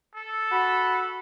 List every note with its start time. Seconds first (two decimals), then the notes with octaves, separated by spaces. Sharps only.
0.15 A4
0.52 F#4 F#5 B5